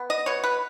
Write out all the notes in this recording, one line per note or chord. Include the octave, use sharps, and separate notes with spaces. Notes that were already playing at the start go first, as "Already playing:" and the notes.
Already playing: B3
D#5
B2 C#5
B4